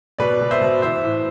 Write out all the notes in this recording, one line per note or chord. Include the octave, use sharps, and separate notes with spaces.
B2 B4 D5
B2
C5 E5
B2
E3 C5 E5
A2